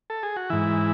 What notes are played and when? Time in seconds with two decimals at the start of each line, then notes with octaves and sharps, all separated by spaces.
0.10 A4
0.23 G#4
0.36 F#4
0.50 G#2 E3 E4